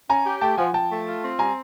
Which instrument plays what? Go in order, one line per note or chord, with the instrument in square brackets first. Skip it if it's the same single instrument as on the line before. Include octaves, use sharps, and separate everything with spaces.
[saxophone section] C#4 [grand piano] G#5 A#5
[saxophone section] G4
[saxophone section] A3 [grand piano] G5 A5
[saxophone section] F3 [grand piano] F#5 G#5
[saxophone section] F3 [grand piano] G5 A5
[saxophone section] A3
F4
C4
[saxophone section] G3 [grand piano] G#5 A#5